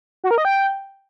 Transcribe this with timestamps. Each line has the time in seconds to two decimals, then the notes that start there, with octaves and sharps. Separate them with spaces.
0.24 F#4
0.31 A#4
0.38 D#5
0.45 G5